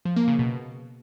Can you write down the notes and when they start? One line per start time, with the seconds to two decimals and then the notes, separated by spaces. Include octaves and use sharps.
0.05 F3
0.16 A#3
0.28 C#3
0.39 B2